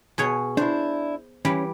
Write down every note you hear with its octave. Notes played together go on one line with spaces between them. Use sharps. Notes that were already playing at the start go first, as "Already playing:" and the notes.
B2 G#4 C#5
D4 E4 C5
E3 G3 C#4